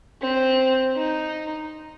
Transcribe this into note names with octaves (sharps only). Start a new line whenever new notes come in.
C4
D#4